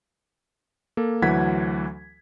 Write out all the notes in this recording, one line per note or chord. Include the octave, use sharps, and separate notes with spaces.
A#3 A4
D2 E3 F#3 F#5 G#6 B6